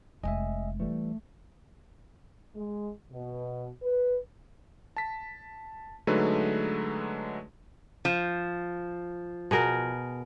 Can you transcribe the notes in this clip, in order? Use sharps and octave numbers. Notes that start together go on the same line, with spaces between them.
F1 G#3 D#5 E5 G#5
E3 G3 A3
G#3
B2
B4
A5 B6
D3 F#3 G#3 A3 D#4 B4
F3
B2 G#4 A#4